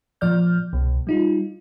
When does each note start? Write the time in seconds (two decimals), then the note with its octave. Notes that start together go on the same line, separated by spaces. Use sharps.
0.21 A#2 F3 D5 F6 G6
0.73 C2 B2
1.07 G3 D#4 F4